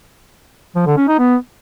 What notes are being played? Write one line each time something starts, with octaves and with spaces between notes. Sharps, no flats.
F3
D3
C#4
D#4
B3